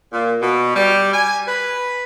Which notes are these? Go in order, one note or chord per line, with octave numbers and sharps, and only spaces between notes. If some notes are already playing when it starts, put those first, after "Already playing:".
A#2
B2
G3
G#5
B4